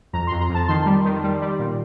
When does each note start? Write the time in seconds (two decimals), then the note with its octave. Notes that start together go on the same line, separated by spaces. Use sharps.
0.13 F2 A#5
0.27 F2 C6
0.41 A#5
0.50 F2 A5
0.68 D#3 C6
0.86 G3
1.05 D#3
1.23 G3
1.41 G3
1.59 A#2